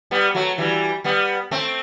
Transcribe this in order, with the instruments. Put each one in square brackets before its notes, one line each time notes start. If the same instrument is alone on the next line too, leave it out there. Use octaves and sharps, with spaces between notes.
[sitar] G3 B3
F#3 A3
E3 G3
G3 B3
A3 C4